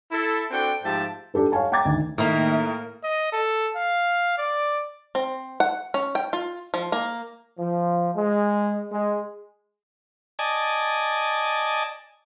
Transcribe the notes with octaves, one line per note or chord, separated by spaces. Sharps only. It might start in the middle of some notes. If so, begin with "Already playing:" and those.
E4 A4
C4 D4 F#4 A4 G5
G#2 F3 A3 G4 G5 A5
D4 G4 A4 B4
C#5 F5 F#5 G#5 A5
G5 A#5 D6 G#6 A6
D2 D#3
A2 D#3 A#3 A#4 E5
D#5
A4
F5
D5
C4
F#5
C#4
G5
F4
F3
A#3
F3
G#3
G#3
D5 D#5 G#5 A5